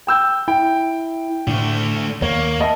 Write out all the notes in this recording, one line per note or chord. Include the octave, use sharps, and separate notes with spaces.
G5 E6 G6
E4 G5
A2 D3 A3
D#2 A#3 C#5
D#5 E5 A5